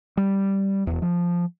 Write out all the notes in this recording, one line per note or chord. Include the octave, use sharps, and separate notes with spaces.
G3
E1 E2
F3